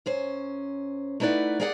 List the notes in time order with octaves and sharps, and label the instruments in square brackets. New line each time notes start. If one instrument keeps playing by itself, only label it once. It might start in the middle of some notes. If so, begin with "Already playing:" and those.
[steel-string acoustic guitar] F#2 C#4 C5
A3 D#4 E4 B4 D5 F#5
A#3 G4 G#4 D5 F5 F#5